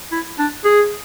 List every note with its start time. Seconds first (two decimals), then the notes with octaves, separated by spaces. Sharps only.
0.12 E4
0.39 D4
0.64 G#4